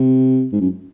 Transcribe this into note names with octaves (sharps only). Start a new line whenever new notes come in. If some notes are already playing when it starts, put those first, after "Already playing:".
Already playing: C3
G#2
F#2